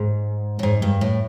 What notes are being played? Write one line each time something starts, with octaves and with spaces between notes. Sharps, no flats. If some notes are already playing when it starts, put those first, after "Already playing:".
Already playing: G#2
A2
G#2
G2
A2